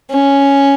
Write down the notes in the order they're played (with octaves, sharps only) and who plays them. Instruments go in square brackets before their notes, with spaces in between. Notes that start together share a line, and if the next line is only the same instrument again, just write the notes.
[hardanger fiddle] C#4